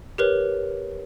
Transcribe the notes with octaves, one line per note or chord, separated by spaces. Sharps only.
G4 A#4 B4 C#5